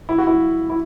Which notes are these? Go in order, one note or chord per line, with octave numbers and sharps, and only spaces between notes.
E4
F#4
E4
E4